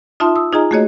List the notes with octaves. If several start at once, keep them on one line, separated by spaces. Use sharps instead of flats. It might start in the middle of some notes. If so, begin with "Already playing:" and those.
D#4 F4 E5 A5 C6 D#6
D#6 E6
D#4 F4 G#4 D#5 G#5 A#5
A3 A#3 F#4 G#4 C#5 D#5